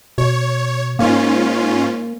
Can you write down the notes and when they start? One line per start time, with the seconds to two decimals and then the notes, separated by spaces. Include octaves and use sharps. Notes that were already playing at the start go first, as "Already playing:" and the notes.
0.18 B2 C#5
0.99 G#2 A#3 C#4 F4